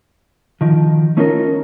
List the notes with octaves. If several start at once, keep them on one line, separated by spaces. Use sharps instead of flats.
D2 D#3 F3
A3 C#4 D#4 F4 G4 A#4